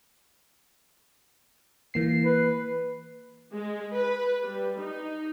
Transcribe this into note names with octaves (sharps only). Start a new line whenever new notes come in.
E3 A#3 C7
B4
G#3
B4
G3
D#4